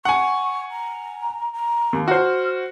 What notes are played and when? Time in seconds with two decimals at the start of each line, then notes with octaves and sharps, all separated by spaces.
0.05 F#5 G#5 C#6
0.71 A#5
1.53 A#5
1.93 D#2
2.08 F#4 C5 F6